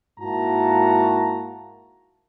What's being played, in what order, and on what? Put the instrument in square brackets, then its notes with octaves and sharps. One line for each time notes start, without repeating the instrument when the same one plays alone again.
[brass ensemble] G#2 A#3 E4 F#4 A5 A#5